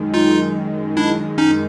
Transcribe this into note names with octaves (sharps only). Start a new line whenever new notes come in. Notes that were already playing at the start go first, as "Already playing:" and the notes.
Already playing: F#2 D#3 G#3
D#4 F4
D4 E4
C#4 D#4